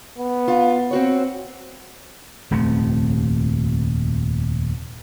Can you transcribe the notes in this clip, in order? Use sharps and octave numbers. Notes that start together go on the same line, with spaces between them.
B3
F4
C4 F#4 C#5
D#1 F2 C3 A3